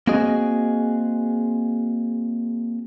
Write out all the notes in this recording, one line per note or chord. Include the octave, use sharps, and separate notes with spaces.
A#3 C4 F#4 G#4 D#5